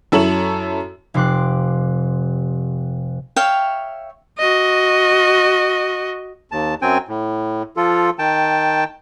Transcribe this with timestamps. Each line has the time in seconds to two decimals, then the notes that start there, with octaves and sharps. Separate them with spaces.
0.12 F#2 E4 A4 C#5 E7 F#7
1.14 F1 C3 C6 D6 F#6
3.36 C#5 E5 F5 G5
4.38 F#4 D#5
6.52 D#2 A5
6.82 F#2 F#3 C4 G5 G#5
7.08 A2
7.77 F3 F4 A4
8.19 D#3 G5 A5